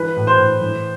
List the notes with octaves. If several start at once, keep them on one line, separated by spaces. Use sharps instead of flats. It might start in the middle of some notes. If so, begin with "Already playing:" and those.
Already playing: E3 B4
A2
C5
A2
E3